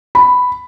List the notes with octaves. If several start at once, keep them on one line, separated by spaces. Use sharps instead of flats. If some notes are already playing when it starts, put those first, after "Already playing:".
B5